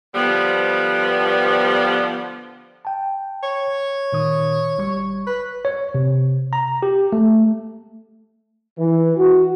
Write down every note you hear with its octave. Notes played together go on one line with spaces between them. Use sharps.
D3 F3 G3 B3
G5 A5
C#5
A#2 D#3 D#6
G1 G3 C#6
B4
C#5
C3
A#5
G4
A3
E3
F#4